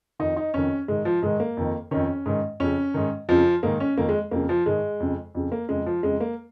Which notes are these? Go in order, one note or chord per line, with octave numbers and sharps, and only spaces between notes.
F2 D#3 D#4
D#4
F2 D#3 C#4
G#2 D#3 G#3
F3
G#2 D#3 G#3
A#3
F2 D#3
F2 D#3 C#4
G#2 D#3
F2 C#3 C#4
G#2 D#3
F2 C#3 F3
G#2 D#3 A#3
C#4
F2 D#3 A#3
G#3
F2 C#3 A#3
F3
G#2 D#3 G#3
F2 C#3
F2 C#3
A#3
F2 C#3 G#3
F3
F2 C#3 G#3
A#3